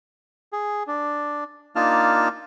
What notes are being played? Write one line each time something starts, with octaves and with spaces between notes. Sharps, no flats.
G#4
D4
A#3 D4 D#4 F4 A5 F6